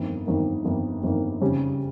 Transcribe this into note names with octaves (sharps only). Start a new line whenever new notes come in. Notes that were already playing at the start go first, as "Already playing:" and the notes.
Already playing: G1 F2 D#3 A#3
G1 F2 D#3 A#3
G1 F2 D#3 A#3
G1 F2 D#3 A#3
F2 C#3 G3 C#4 G4